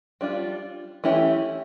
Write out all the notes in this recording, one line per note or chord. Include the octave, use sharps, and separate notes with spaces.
G3 D4 F4
E3 A3 C#4 E4 G4